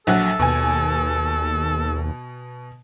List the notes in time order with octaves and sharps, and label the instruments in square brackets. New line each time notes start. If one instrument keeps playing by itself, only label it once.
[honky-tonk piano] A#1 F#3 F#5 [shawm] A4
[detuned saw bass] D#2 [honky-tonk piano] B2 G#5